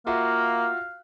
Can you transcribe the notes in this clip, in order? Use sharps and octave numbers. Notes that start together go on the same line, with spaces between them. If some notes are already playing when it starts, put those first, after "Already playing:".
A#3 F4 F#4 E5 F5